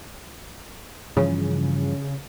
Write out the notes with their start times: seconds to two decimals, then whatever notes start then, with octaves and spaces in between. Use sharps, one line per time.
1.17 G2 C#3 E3 F3